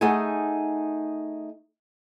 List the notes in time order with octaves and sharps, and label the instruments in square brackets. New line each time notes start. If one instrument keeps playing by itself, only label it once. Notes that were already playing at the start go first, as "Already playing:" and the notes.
[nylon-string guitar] A3 D#4 G#4 F#5 G#5